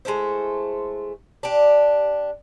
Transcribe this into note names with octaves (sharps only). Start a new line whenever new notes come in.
G#3 A3 E4 C5
D4 G4